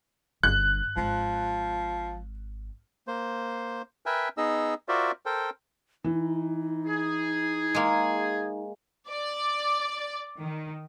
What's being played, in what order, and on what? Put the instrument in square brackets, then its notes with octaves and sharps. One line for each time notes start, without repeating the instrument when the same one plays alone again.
[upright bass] G1 [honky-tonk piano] F#6
[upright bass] G#1 [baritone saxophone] F3
[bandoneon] A#3 C5
A#4 B4 E5 G5 G#5
B3 D#4 G#4 D#5 E6
F4 F#4 A#4 C5 D5 E5
A4 A#4 C5 G5
[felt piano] E3 [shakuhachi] D#4
[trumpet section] G#4
[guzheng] G#3 A#3
[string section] D5
D#3